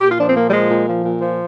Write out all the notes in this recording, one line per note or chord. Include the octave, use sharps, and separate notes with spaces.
A#2 G4
F4
F3 D4
C4
A#2 A#3
G3
F3 G#3
A#2
F3
A#2
F3